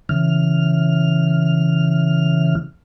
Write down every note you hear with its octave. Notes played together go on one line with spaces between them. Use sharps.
C#3 E3 F6